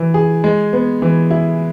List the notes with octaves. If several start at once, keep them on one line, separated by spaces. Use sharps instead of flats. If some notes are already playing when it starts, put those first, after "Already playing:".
Already playing: E3
G#4
G#3
B3
E3
E4